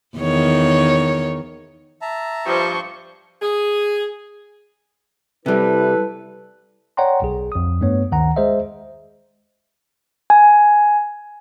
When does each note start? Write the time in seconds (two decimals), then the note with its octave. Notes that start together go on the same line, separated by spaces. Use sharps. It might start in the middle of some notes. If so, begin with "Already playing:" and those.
0.18 E2 D#3 C#5
2.02 E5 A5 A#5
2.46 G2 F3 C5 C#6
3.42 G#4
5.46 C3 G3 E4 A4 B4
6.97 C#5 D5 F#5 G5 A#5 C6
7.22 B1 G#4
7.52 F2 D#6
7.81 G2 A3 B3 C#5
8.12 D2 D#3 F#5 A#5
8.36 G#3 G#4 C5 D#5 E5
10.30 G#5